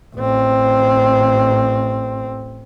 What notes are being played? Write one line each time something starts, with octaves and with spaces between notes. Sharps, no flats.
A1 C4